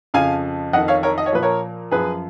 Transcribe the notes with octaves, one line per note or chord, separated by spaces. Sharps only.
F2 C#3 F3 F5 G#5
F2 D#3 D#5 F#5
C#5 F5
A#4 C#5
D#5
C#5
A#2 F3 B4
A#4 C#5
F#2 F3 G#4 B4